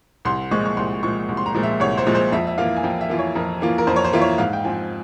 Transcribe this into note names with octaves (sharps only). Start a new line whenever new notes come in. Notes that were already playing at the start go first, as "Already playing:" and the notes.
C2 C6
A#2 F3 G#3 C#6
C#6
C2 C6
A#2 F3 G#3 C#6
C2
C6
A#5
A#2 F3 G#3
E5
C2 C#5
C5
A#2 F3 G#3
C5
F2 E5
E5
E3 A#3 F4 F5
G#5
F2 G5
E5
E3 A#3 F4
C#5
F2 A#4
E3 A#3 F4
A#4
F2 C5
C#5
C5
E3 A#3 F4 E5
C#5
G#2 F5
G5
F3 C4 G#5